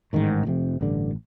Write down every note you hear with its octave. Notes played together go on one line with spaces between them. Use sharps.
A1 G#2 D#3
F1 F2 C3
A1 G2 D3